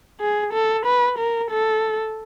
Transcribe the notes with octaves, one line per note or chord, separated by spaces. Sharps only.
G#4
A4
B4
A#4
A4